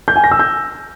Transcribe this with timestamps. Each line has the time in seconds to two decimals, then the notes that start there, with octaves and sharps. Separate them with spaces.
0.08 G6
0.16 G#5
0.24 A#6
0.31 E6
0.39 G6